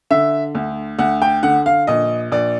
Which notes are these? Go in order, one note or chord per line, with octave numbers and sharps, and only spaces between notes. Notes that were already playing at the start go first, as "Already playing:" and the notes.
D3 E5
D2
D2 F#5
G5
D3 F#5
F5
A#1 D#5
A#1 D5